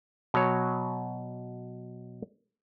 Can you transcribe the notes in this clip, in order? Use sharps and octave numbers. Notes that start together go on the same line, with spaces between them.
B2 F#3 C#5